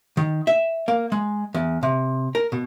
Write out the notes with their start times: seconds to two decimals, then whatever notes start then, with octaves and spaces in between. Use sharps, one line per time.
0.17 D#3
0.47 E5
0.88 A#3
1.12 G#3
1.54 E2
1.83 C3
2.35 A#4
2.52 B2